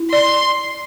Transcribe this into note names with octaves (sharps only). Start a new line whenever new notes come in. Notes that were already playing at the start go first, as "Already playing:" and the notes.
Already playing: E4
D5 C6